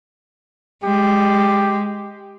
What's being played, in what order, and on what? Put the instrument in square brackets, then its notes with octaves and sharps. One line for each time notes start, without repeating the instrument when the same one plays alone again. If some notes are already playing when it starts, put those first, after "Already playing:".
[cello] G#3 [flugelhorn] G4